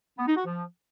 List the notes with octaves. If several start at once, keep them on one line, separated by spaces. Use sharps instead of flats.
B3
D#4
F#4
F3